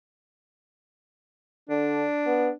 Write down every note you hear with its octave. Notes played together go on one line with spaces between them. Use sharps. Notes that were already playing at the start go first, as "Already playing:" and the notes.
D3 D4
B3